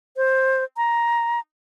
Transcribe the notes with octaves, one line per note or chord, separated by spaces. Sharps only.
C5
A#5